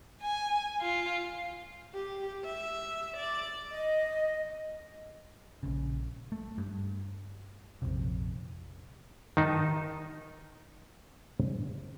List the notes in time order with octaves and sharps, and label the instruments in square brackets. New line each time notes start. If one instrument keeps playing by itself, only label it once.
[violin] G#5
F4
[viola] G4
E5
D5
[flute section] D#5
[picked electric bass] A#1 C#3
A3
G2
A#1 F2 C3
[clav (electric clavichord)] D#3 D#4 A5